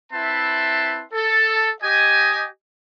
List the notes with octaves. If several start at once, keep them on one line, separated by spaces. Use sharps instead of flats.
C4 E4 B4 E5 A5 C6
A4
G4 D#5 G#5